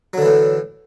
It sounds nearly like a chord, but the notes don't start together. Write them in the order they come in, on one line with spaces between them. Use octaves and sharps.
F#3 D3 E3 A2